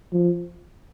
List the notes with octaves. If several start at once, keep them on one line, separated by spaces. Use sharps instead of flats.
F3